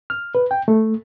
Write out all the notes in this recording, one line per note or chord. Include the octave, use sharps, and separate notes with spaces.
F6
B4
G5
A3